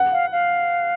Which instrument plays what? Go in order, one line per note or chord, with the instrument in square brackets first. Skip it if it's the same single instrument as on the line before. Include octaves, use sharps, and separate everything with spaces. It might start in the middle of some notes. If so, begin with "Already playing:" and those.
Already playing: [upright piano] F#5
[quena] F5
F5